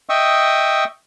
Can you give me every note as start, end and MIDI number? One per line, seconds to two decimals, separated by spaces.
0.09 0.84 75
0.09 0.84 76
0.09 0.84 79
0.09 0.84 85
0.09 0.84 87
0.09 0.84 88